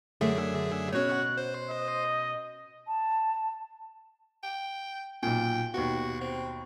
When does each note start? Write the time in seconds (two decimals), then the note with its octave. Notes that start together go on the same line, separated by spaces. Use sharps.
0.21 F#2 D3 A3 G#4 E5
0.93 B2 C#4 F#4 C#5 F#6
1.37 C5
1.70 D#5
2.87 A5
4.43 G5
5.23 B1 A#2 G5
5.74 D#2 B2 F#4
6.21 C4